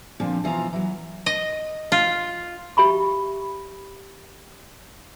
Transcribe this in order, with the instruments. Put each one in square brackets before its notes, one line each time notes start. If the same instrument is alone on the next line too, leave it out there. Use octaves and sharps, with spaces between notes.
[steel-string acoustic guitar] A#2 D3 F3 C4
B2 E3 F3 F4 A#5
E3 F#3
[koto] D#5
F4
[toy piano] G4 E5 B5 C#6